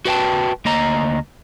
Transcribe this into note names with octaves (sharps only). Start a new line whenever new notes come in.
F#4 B4 G5 A5
D2 A#3 D#5 A#5